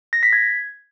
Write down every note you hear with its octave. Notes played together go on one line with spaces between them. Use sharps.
A#6
B6
G#6